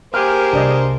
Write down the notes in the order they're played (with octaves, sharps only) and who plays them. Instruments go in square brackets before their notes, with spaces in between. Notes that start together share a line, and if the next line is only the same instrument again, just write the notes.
[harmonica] A#3 C5 [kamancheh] G4 G#4 [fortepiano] F6
[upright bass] C2 [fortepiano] D4 D5 D#5